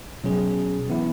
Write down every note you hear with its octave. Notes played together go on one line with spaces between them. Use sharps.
B2 F#3 C#4 G#4
E3 B3 E4